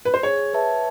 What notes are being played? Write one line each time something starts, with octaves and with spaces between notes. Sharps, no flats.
B4
C5
G#4 C#5
B4 E5 A5